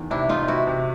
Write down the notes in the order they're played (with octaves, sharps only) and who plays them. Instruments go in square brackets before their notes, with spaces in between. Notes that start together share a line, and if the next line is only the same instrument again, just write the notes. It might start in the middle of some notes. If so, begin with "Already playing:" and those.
Already playing: [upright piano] E2 D#3
[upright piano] C3 [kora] D4 E4
[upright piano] E2 [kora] D#4 F4
[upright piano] C3 [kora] E4 F#4
[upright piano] C3